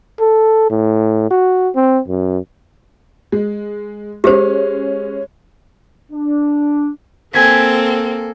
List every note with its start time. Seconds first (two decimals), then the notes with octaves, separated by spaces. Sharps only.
0.20 A4
0.70 A2
1.31 F#4
1.75 C4
2.08 F#2
3.32 G#3
4.24 G#3 C#4 G4 G#4 C5
6.12 D4
7.34 A#3 C4 A4 G#5 G#6 B6